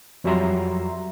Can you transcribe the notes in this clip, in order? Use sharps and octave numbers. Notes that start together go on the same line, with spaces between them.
F2 F#3 G3 E5 A#5 C6